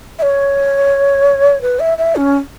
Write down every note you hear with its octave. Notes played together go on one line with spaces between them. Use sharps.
E5
C#5
B4
E5
E5
C#4